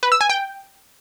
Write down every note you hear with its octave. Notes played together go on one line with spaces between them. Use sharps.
B4
E6
G#5
G5